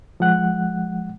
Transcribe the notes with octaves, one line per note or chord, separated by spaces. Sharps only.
F3 G#3 F#5 F#6